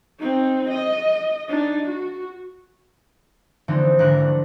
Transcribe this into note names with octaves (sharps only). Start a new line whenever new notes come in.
C4 D#4
D#5
D4 D#4
F#4
D3 E3 F3 A#3 C4 D#4
G#1 D3 D4 A#4 F#6
A3